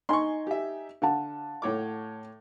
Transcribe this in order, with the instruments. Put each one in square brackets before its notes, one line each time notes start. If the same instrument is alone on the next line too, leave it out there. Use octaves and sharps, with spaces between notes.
[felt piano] D#4 G#5 [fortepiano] C6 C#6
[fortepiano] G4 E5
[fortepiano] D3 [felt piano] F5 F#5 A5
[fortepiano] A2 C#5 D6